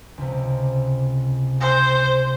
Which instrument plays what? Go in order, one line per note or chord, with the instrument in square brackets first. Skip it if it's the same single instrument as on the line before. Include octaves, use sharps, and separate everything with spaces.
[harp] C#2 C3
[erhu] C5